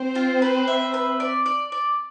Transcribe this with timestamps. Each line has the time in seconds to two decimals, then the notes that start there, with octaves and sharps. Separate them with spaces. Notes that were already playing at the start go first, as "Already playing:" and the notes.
Already playing: C4 C5
0.15 F4
0.42 B4
0.68 E5
0.94 B4
1.20 D5
1.46 D5
1.72 D5